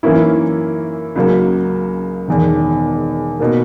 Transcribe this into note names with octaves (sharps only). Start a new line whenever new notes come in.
F#2 E3 A#3 C#4 E4
C#2 C#3 F#3 A#3
E1 E2 D#3
B2 A#3